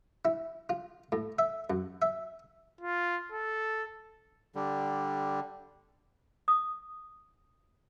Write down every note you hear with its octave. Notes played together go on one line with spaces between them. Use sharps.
E4
F4
A2
E5
F#2
E5
F4
A4
D3 G3
D#6